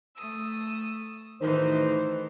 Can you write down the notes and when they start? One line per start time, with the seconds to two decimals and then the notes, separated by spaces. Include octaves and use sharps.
0.15 A3 D#6 E6
1.42 D2 A2 D#3 E3 D#4 B4 C5